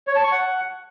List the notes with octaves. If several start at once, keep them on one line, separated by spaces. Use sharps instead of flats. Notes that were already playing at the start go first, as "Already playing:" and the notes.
C#5
A5
C#6
F#5